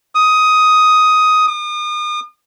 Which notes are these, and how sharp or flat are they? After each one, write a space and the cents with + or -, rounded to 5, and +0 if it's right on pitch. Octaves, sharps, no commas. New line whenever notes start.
D#6 +10
D#6 -40